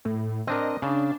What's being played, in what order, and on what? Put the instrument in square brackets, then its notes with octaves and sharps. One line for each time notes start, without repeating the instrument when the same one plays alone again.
[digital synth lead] A2
[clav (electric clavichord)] C4 D4 A#4 [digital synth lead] D#5
[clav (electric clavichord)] C#3 [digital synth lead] D4